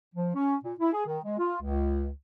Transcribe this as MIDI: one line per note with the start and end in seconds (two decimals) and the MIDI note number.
0.15 0.30 53
0.34 0.56 61
0.64 0.73 46
0.79 0.92 64
0.93 1.03 68
1.06 1.19 51
1.25 1.37 56
1.39 1.56 65
1.61 2.09 37